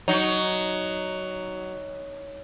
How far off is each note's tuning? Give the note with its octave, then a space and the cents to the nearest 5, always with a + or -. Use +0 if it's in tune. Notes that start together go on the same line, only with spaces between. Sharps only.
F#3 +10 D#4 +0